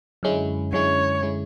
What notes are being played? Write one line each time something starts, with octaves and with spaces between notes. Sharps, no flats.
F#2 D3 G#3 C#4 E4
F#2 D3 G#3 C#4 E4 C#5
D3 G#3 C#4 E4